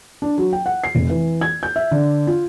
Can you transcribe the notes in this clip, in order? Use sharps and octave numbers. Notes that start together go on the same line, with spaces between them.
D4
F#3
G5
F#5
C7
F1
E3
G#6
G6
E5
D3
F4